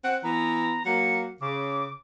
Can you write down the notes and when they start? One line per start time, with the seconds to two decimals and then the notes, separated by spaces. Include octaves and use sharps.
0.04 C4 F#5
0.24 E3 B3 A#5
0.86 F#3 A#3 C#7
1.41 C#3 D6